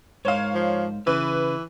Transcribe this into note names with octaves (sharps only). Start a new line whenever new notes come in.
G#2 A#4 C5 C#5 F5
F3
C#3 E3 B4